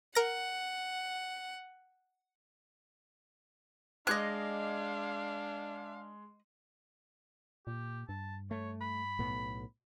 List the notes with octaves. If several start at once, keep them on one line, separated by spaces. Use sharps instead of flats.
A#4 F#5 A#6
G#3 D4 D#5 F5 D6 F#6 G#6
A#2 G4
G2 A5
A3 C#5
B5
B1 A2 B3